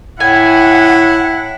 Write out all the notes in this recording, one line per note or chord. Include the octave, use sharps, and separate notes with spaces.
A2 E4 F#5 G#5